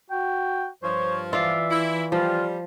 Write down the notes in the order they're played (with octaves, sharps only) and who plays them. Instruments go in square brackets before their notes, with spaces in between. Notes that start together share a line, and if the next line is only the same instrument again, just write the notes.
[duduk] F#4 [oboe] G5
[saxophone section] G2 F3 [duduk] C5 [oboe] C#5
[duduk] E3 [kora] F4 D5 F5 [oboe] E5
[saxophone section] E4
[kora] F3 [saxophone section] G3 [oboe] F4